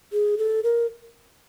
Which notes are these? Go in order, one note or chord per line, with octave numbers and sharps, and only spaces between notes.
G#4
A4
A#4